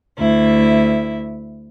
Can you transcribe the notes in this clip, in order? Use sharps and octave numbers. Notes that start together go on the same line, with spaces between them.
D2 E4